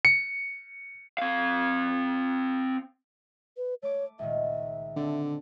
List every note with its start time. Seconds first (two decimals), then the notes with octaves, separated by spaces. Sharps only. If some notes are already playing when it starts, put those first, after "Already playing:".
0.05 C#7
1.18 C4 F5
3.57 B4
3.82 A3 C#5 D6
4.19 C#2 A#2 D#3 E5
4.96 D3 A3 C4 D4